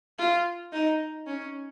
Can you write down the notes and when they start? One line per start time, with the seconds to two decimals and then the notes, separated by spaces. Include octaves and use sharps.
0.19 F4
0.72 D#4
1.27 C#4